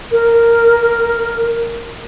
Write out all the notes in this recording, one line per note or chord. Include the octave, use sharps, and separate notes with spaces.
A#4